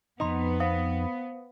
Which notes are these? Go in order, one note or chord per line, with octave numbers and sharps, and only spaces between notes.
F2 C#3 B3 D#4 D#5 A#5 C6
C5 F5 D#6